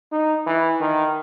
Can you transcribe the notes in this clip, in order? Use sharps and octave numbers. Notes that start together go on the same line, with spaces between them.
D#4
E3
D#3